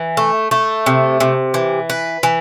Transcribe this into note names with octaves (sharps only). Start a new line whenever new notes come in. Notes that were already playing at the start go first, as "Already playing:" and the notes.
Already playing: E3
A3
A3
C3
C3
E3
B4
E3